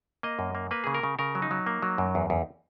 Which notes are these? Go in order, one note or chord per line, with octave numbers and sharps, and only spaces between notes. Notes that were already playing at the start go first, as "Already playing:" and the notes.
A#3 D#5
F#2
A#3
A#3 B4
C#3 G#4
A#4
C#3
C#3 A#4
F#3
D#4
F#3
A#3
F#3
F#2
E2
E2